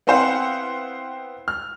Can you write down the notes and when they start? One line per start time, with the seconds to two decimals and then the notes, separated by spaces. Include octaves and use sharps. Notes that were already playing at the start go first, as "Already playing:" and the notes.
0.07 B3 C4 E4 C5 F5 F#5
1.48 F6